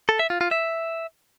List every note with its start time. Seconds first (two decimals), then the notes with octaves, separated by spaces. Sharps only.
0.09 A4
0.19 E5
0.30 F4
0.41 F4
0.51 E5